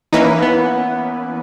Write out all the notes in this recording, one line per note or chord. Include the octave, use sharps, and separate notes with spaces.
E3 A#3 C#4 D#4 E4 B4
B3